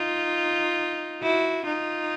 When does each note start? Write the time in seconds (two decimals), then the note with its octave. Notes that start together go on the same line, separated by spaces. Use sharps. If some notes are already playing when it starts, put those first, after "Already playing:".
Already playing: D#4 F4
1.22 E4 F#4
1.66 D#4 F4